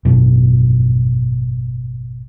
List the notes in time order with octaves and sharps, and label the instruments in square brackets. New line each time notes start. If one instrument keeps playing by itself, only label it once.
[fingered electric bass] G#1 F#2 B2